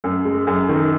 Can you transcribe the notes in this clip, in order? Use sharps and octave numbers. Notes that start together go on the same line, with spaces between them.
F#2
G#3
F#2
D#3